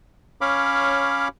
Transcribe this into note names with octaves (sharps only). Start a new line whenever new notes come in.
C#4 C#5 F5 B5 D6